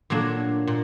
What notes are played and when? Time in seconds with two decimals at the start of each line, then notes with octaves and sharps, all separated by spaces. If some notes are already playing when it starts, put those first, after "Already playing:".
0.10 A#2 F#3 A#3 D4
0.67 A#2